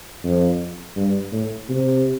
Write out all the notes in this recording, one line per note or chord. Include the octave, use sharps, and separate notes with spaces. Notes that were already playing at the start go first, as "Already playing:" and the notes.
F2
G2
A2
C3